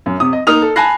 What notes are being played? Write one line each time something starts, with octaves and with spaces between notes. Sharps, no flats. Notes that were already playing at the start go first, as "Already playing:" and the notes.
F#2
C3 D#6
D#5
A#3 D#4 D#6 F6 F7
A4
G#5 A5 B5 F#6 A#6 C7